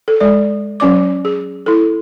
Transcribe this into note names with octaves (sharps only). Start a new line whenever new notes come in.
A4
G#3 D5
F#3 C#4 D5 D6
G#4
E4 A4